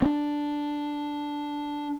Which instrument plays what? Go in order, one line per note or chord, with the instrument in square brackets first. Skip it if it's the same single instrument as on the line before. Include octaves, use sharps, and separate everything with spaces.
[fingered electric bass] C4 D4